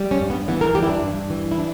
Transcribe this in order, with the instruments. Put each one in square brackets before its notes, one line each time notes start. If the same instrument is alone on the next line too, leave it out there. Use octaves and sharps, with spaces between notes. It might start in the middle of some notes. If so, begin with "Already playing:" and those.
Already playing: [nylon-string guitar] G3
C#4
G2
B3
E3 B3
A#4
G3 G4
E4
D4
G2
E3
E4
D4